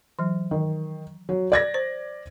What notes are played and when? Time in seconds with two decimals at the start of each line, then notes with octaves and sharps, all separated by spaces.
0.19 E3 F#3
0.51 D#3
1.29 F#3
1.52 D5 G#6 A#6
1.74 C5